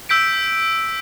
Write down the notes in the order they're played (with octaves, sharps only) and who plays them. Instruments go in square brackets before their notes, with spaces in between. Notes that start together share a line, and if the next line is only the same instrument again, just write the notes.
[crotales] E6 G6 B6 D7